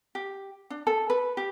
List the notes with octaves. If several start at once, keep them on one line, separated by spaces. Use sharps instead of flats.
G4
D4
A4
B4
G4